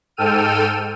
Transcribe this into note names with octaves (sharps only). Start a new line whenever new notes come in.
G#2 A4 G5 E6 F6 D#7